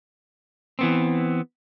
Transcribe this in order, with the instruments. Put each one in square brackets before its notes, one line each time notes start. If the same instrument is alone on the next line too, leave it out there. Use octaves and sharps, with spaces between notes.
[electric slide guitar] E3 B3 C4